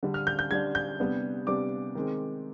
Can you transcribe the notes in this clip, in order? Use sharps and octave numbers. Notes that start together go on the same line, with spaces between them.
D3 G3 D4
F6
G6
G6
D3 G3 D4 G#6
G6
C3 G3 B3 D4
C3 G3 B3 D4 D6
D#3 G#3 C4